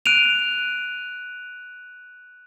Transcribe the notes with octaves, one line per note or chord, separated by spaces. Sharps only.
F#6 D7 D#7 F7